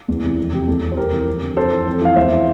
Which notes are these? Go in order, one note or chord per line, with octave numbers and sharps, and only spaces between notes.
E2
C3 E3
F2
C3 E3 G4
E2 A4
E3
C5
F2 G4 A#4
C3 E3
F2
D3
F2 A4 C5
E3
F2
E3 F5
E2 C5 E5
E3